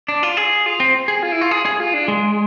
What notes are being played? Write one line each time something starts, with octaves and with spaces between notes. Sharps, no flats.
D4
F4
G#4
F4
C4
G#4
F4
E4
F4
G#4
G#4
F4
D4
G#3